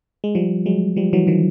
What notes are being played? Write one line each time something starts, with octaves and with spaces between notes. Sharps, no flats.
G#3
F3 G3
F#3 G#3
F3 G3
E3 F#3
D#3 F3